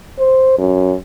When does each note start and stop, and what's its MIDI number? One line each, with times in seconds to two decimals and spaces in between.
0.19 0.57 72
0.58 0.95 42